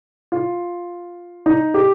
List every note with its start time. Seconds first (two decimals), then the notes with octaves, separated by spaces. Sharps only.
0.32 F4
1.46 D#4
1.74 G4